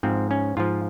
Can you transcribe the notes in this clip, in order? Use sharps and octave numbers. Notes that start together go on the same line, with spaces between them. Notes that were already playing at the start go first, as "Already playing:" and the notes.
G#2 F3 C4
C#4
G#2 F3 F4